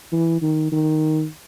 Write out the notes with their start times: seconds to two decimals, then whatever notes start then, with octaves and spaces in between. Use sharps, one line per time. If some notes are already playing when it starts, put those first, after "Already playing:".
0.12 E3
0.42 D#3
0.72 D#3